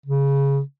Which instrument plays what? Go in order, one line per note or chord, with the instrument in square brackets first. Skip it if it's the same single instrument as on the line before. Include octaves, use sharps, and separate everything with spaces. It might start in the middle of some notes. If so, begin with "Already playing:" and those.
[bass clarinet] C#3